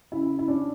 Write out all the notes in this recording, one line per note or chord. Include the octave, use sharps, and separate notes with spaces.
C#3 E4
E4
C#4 D4